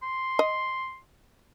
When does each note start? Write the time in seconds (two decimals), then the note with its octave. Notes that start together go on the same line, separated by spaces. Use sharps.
0.02 C6
0.39 D#5